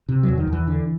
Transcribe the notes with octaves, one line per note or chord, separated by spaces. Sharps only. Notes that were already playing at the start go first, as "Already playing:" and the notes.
C3
F#3
E2
D#3
E2
E3
D3